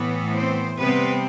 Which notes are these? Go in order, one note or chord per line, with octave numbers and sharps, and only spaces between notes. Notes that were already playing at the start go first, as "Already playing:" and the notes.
Already playing: A2 E3 B3
C4 C5
C3 G3 B3 C4 B4